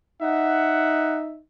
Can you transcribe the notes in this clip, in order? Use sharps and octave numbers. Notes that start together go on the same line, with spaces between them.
D#4 E5 F#5